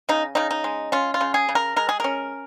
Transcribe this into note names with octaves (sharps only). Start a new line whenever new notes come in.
C#3 D#4
C#3 D#4
D#4
G#3
C#4 F4
F4
C#3
G#4
C#3
A#4
G#3 A#4
G#4
C#4 A#4